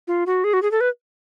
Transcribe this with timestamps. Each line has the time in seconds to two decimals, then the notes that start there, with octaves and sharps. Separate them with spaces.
0.08 F4
0.26 F#4
0.44 G#4
0.53 F#4
0.62 G#4
0.71 A4
0.81 B4